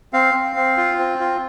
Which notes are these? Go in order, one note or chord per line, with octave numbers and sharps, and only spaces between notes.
C4 F5
C4
C4
F4
C4
F4